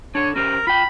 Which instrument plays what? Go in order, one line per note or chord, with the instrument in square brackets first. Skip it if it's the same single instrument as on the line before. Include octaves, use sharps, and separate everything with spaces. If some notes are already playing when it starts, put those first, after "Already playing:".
[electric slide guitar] D4 A4 [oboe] C#5
[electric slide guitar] C#4 G4 C5 [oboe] A#4
[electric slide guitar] F4 G5 [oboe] B5